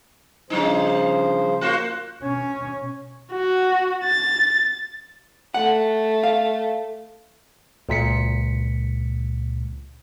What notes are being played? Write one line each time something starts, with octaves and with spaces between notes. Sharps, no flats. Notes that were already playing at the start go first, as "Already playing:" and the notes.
C#3 F3 G3 D4 D#4 C5
A#3 F4 F#4 C5
B2 C#4
F#4
A6
A3 F#5
F5
C#2 A#2 B6 C#7